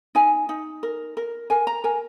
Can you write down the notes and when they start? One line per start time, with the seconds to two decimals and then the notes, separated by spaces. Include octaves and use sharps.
0.15 D#4 G#5
0.49 D#4
0.83 A#4
1.17 A#4
1.50 A#4 G#5
1.67 A#5
1.84 A#4 G#5